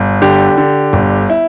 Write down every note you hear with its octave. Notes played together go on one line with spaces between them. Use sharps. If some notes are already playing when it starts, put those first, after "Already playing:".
Already playing: G1
D3 G4
D3
G1
E4